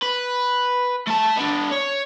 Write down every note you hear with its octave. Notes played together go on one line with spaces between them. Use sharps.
B4
A3 A5
B3 D4
C#5